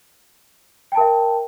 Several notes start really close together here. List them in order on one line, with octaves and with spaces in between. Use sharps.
G5 A5 A#4 E5